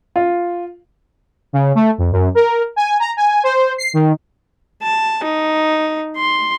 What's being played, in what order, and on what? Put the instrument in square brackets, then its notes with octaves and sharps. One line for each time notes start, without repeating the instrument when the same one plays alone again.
[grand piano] F4
[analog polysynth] C#3
A3
F2
F#2
A#4
G#5
A#5
G#5
C5
C7
D#3
[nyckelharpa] A5
D#4
C6